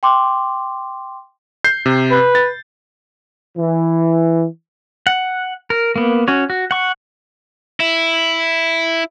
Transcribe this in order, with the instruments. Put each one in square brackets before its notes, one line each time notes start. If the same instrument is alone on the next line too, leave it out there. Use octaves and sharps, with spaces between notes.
[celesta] G5 C6 D6
[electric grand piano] G6 C7
C3
[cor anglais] B4
[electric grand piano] A6
[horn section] E3
[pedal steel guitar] F#5
A#4
A#3 B3
C#4 F#4 C#5
F#4
F#5 C#6
[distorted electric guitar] E4